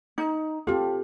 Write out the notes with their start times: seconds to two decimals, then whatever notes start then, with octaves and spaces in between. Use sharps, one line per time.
0.18 D#4
0.67 C4 F4 G4 A4